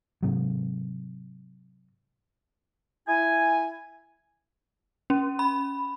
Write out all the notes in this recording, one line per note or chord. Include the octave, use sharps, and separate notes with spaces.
G#2 C3 F#3
E4 G#5
C#4
B5